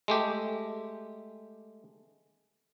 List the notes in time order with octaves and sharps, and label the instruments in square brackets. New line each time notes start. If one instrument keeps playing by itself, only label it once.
[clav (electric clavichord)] G#3 A3 G4